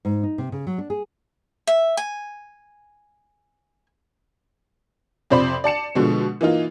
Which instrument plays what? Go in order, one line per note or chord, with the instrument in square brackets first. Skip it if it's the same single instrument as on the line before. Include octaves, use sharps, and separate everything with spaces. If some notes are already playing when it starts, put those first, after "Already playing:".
[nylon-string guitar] G#2
D#4
C3
C#3
F#3
D4
G#4
[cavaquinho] E5
G#5
[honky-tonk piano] F2 C3 C5 D5 B5 F#7
D5 A5 C#7 E7
B2 D3 F3 G#3
E3 A#3 D#4 F4